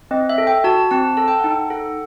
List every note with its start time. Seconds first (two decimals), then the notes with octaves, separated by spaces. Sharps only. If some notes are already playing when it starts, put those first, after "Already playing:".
0.11 C4 D#5
0.29 E5
0.38 A4
0.47 G5
0.64 F#4 A5
0.91 C4 A5
1.17 A4 A5
1.28 G5
1.39 D#4 F#5
1.50 G5
1.70 A4 F#5